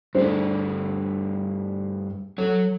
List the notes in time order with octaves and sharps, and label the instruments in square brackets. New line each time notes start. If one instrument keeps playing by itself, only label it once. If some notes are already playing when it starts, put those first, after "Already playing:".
[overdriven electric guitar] G2 A3 [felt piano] D4 G#4 C5
[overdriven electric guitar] F#3 C#5 [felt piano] A4